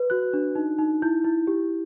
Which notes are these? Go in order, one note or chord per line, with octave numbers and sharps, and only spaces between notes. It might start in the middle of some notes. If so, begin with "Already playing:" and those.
Already playing: B4
F#4 F#6
D4
D#4
D#4
E4 G6
E4
G4